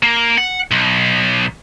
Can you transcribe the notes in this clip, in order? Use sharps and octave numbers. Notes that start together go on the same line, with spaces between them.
A#3
F#5
B1